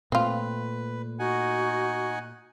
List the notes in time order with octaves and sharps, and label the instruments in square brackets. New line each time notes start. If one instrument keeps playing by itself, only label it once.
[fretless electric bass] A#2 A3 [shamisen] C4 F4 [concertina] B4
[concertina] D#4 F#5 G#5 [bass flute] F#4